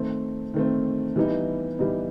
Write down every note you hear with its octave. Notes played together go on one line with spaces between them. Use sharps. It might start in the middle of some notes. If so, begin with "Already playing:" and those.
Already playing: D#3 A3 C4
D#3 A3 C4
E3 G3 B3 D#4
E3 G3 B3 D#4